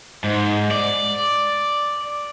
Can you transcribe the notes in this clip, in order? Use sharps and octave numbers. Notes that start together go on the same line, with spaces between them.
G#2
D5